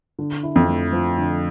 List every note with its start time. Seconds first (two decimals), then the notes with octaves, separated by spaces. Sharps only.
0.19 D3
0.43 E4
0.56 F2
0.68 A3
0.92 F3
1.18 D3